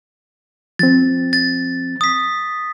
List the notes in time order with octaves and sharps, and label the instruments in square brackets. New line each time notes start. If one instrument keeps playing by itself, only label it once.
[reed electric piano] F3 C4 [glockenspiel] A6
[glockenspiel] A6
D#6 B6